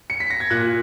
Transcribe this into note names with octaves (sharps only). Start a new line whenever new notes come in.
C#7
B6
A#6
G#6
A#2 F#6